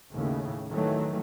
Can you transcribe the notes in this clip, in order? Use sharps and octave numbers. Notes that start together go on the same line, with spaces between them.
D#2 A2 C#3
D#3 E3 F#3 A3